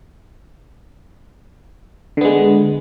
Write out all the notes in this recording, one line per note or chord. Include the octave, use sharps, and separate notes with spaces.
D3 G#3 B3